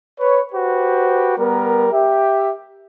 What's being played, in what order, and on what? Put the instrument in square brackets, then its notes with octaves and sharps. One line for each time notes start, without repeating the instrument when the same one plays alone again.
[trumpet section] B4 C#5
F#4 G4 B4 C5
G3 B3 A#4
G4 E5